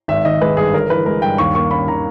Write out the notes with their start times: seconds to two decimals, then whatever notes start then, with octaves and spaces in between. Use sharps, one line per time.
0.08 G#1 E5
0.25 D#3 D#5
0.41 G#3 B4
0.57 G2 G#4
0.73 G1 A#4
0.90 E3 B4
1.06 G#3 A#4
1.22 G2 G5
1.38 D#2 C#6
1.55 A#3 C#6
1.71 C#4 B5
1.87 D#3 A#5